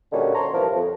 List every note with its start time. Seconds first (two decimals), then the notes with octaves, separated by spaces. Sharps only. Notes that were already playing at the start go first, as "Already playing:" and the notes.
0.12 A#2 D3 G3 C#4 D#4 F#4
0.34 C5 C#5 A5 A#5 C6
0.53 G2 C3 E3 F3 A#4 A5
0.74 F2